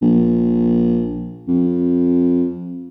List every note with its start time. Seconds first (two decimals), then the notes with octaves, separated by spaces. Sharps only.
0.02 A#1
1.48 F2